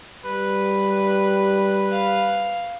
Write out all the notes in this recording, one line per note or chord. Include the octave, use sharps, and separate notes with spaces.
G3 B4
F5